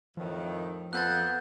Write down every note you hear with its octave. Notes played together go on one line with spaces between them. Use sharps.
F2 A2 D#3 F3
F2 B3 A4 C5 F#6 G6 A6